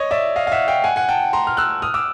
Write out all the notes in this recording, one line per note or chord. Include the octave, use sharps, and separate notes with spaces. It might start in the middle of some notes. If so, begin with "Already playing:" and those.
Already playing: C#5 D#5
D5 E5
D#5 F5
F5
E5 F#5
F5 G5
F#5 G#5
F#5 G#5
G5 A5
A#5 C6
F6
E6 F#6
D#6 F6
D6 E6